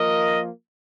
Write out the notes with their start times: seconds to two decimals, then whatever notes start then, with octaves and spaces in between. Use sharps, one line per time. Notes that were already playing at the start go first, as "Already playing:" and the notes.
Already playing: F3 A#3 F4 A#4 D#5